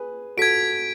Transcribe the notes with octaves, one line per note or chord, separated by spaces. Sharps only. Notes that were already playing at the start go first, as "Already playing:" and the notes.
Already playing: G#4 B4
F#4 A4 G#6 B6 D7